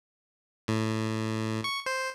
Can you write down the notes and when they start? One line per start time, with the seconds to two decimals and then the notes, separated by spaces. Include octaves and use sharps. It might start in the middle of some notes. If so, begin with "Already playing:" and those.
0.68 A2
1.64 C#6
1.86 C5